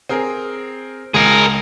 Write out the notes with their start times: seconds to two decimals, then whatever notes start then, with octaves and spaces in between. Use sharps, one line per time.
0.09 C4 G#4 A#4
1.14 C#2 G#4 A#4